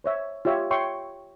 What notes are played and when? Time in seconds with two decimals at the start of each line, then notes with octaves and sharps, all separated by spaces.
0.04 C5 C#5 E5
0.45 F4 G4 C#5 E5
0.71 C#5 E5 G5 C6 C#6